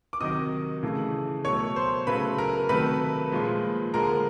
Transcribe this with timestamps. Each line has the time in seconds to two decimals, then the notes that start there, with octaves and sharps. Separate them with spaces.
0.13 D6
0.20 C3 D#3 F#3 D#5 D#6
0.83 C#3 E3 A3
1.45 B2 F#3 A3 C#5 C#6
1.76 C5 C6
2.07 C#3 F#3 A3 B4 B5
2.38 A#4 A#5
2.69 C3 D#3 F#3 A3 B4 B5
3.32 A#2 F3 G#3
3.94 D3 F3 G#3 A#4 A#5